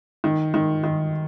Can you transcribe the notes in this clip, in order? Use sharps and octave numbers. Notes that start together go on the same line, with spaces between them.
D#3
D#3
D#3